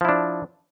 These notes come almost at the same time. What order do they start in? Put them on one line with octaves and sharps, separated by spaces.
F3 E4 D4